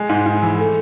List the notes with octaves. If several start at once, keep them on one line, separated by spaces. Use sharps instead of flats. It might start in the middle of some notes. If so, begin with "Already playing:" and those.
Already playing: G#3
G#2
G#2
E3
A3